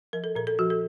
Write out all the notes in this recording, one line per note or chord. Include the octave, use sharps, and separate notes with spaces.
F3 A#4
A4
A#2 A#4
A4
F3 F#4
A4